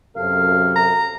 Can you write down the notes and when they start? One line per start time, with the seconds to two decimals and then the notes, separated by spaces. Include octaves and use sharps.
0.17 F#2 C3 A4 F5
0.76 A#5